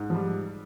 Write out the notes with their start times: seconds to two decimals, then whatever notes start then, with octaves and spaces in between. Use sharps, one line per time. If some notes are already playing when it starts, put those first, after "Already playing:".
Already playing: G#2
0.10 F3
0.14 G3